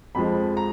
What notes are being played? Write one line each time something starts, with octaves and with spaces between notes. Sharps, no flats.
F2 F3 G#3 B5
A#5